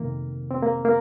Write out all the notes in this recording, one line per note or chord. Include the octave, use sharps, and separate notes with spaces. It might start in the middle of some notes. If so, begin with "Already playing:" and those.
Already playing: F2 C3 D#3 A#3
C4
A#3
A#3